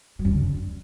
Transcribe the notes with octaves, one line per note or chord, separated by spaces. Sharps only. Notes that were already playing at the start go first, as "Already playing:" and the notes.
F#3
F#2
D3